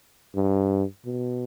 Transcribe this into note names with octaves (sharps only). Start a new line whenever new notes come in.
G2
B2